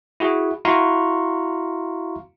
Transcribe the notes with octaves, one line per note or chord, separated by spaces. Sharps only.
E4 F#4 G#4
E4 F#4 F5 A#5 C6 C#6